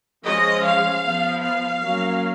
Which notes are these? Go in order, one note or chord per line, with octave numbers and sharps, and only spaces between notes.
F3 G#3 C#4 D#5
F5
F3 B3
F5
F#3 A#3 C#4